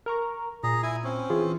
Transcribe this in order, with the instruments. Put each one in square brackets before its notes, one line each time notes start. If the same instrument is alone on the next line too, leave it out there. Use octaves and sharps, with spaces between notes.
[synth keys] A#4 A#5 C#6
[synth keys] A#2 [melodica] G#4 A#5
[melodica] E4 G#5
C4 C#4
[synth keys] E3 F4 G#4